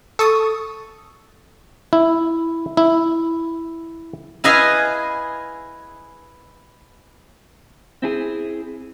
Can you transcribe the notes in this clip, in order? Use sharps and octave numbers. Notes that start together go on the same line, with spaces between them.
A4 C#6 D#6
E4
E4
E4 G#4 B4 D#5 F5 G#5
C4 E4 G#4